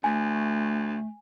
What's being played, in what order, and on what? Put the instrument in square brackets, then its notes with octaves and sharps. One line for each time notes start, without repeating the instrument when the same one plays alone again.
[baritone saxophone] D2 [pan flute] A3 [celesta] G#5